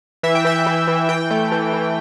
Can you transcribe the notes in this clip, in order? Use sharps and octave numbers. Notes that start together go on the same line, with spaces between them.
E3 E5
G5
E3 E5
E3
E3
E3 G5
A3
E3
E3